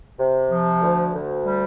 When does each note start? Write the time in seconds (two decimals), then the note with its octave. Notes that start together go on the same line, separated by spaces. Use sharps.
0.19 C3
0.51 F3
0.82 D2
1.14 D2
1.45 G3